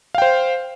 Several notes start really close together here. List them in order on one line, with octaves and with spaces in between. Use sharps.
F5 G5 C5